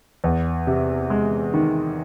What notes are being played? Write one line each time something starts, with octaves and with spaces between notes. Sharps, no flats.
E2
C3
G#3
D#3